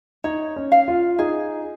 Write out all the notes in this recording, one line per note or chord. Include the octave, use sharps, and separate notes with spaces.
D#4 C#5
C#4
F5
F4
D#4 G#4